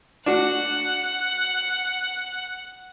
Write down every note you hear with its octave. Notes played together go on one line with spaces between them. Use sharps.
D4 F#4 F#5